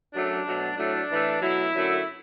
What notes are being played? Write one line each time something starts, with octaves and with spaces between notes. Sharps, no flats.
F#2 F#3 A3 D4
B2 F#3 A3
A2 F#3 A3 D4
A2 E3 A3
B2 F#3 A3 E4
F#2 D3 F#3 A3